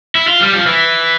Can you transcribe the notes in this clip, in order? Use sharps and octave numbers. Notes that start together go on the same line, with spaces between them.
E4
F4
G3
F3
E3